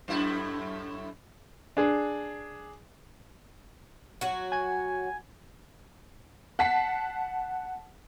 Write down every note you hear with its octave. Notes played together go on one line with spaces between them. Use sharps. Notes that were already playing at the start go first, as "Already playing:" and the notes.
F#2 A2 E4
D4 G#4
F#3 F#4
G#5 G#6
F#5 A5 B6 C7